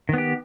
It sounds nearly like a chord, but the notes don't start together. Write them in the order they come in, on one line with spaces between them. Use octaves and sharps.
D#3 B3 G4